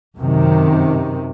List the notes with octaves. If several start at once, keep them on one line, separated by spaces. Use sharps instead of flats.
F#2 C3 D#3